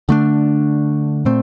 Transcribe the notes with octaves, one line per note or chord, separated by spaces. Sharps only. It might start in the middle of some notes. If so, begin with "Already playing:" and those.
D3 A3 D4
A#2 A3 C4